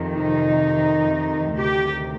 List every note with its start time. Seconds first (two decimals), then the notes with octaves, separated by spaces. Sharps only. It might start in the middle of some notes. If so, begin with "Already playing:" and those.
Already playing: F2 C3 D#3
0.12 D#4
1.57 D2 C3 D#3 G4